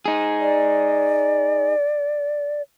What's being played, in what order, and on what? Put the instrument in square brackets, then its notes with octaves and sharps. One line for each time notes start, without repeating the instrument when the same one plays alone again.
[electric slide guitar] D#4 G#4
[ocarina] D5